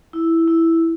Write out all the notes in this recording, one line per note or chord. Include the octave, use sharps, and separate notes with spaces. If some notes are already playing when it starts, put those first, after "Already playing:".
E4
E4